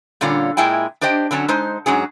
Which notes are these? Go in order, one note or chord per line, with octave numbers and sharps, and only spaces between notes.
A#2 D3 G3 C#4 F4
A#2 G#3 E4 G5 G#5
D4 G4 C5 D#5 G5
D3 F#3 C#4 A5
G#3 D#4 C5
G#2 F#3 C#4 G#4